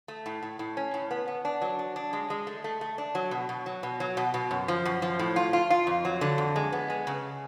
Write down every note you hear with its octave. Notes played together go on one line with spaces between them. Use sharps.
A3
A2
A2
A2
C#4
A2
B3
B3
D4
F#3
D4
D4
G#3
G#3
A3
A3
A3
D4
F#3
B2
B2
F#3
B2
F#3
B2
B2
F#2
F3
F#2
F3
A2
F4
F4
F4
F2
F#3
D3
F2
G#3
B3
G#3
C#3